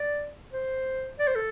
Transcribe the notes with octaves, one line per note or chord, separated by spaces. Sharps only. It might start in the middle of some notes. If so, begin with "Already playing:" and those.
Already playing: D5
C5
D5
C5
A4